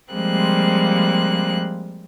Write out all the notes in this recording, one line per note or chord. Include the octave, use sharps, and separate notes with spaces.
F3 G3 G#3 A#3 C4 F#6